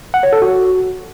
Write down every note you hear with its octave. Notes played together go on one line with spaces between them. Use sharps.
F#5
C#5
A4
F#4